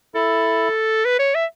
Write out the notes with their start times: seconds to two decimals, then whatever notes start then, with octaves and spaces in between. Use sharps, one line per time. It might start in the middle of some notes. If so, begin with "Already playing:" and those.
0.15 E4 A4
1.05 B4
1.19 C#5
1.35 E5